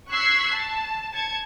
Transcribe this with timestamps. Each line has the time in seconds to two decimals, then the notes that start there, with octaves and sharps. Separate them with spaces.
0.10 C#6 E6 F#6 G#6 B6 C7
0.54 A5
1.13 A5 G#6 C#7